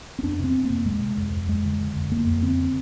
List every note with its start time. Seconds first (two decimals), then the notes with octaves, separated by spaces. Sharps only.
0.19 C4
0.23 F2 D4
0.39 C3 C4
0.55 C3
0.65 F2 A#3
0.86 C3 G#3
1.02 C3
1.18 F2
1.32 F2
1.48 F2 G#3
1.65 D3
1.80 D3
1.96 F2
2.11 F2 A#3
2.27 F2
2.42 D3 C4
2.59 D3